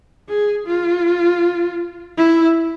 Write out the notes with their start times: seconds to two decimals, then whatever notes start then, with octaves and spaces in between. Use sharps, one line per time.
0.29 G#4
0.67 F4
2.18 E4